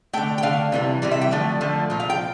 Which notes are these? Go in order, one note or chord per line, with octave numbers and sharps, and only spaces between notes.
D3 A3 G5
G5
D3 A3 F5
C3 E3 G3
C3 E3 G3
E5
G5
D3 F3 A3
D3 F3 A3
A#2 F3
F5
G5